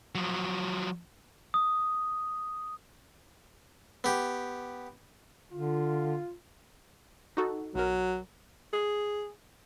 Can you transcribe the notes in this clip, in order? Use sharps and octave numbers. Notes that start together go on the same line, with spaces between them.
F3 F#3
D#6
B3 G4
D3 F4
D#4 F#4 A4
B1 F#3 A#4
G#4